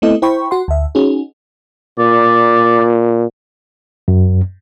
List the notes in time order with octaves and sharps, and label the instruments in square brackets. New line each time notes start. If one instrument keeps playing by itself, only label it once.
[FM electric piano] A3 B3 C4 E4 A4 D#5
E4 C5 G5 B5 C#6
F#4 F#5 C6
D2 E5
C#4 D#4 F#4 G#4
[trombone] A#2 [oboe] D5
[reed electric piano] F#2